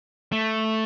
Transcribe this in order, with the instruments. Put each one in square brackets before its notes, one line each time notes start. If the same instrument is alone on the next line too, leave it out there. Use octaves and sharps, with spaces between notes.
[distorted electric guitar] A3